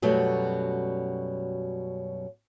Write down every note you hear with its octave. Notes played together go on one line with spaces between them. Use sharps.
F#2 B2 F#3 G3 A3